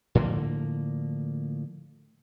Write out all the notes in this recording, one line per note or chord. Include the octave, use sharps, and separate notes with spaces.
A2 D3 F3 A#3